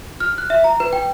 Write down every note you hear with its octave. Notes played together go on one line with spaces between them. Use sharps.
F6
F#6
E5
A#5
B4
G5